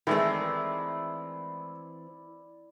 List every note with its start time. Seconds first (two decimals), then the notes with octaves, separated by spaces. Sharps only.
0.07 D#3 E3 G#3 A3 C4 E4 D5